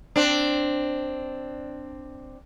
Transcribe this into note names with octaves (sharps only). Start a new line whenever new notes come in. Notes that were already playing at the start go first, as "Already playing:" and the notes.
C4 D4